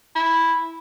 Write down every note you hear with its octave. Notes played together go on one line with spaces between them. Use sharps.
E4